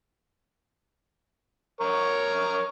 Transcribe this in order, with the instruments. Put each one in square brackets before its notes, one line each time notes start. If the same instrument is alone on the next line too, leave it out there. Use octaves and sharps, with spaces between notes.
[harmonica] A#4 C#5 C#6